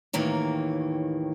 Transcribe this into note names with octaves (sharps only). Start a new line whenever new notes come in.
D#2 A2 D#3 E3 A#3 C#5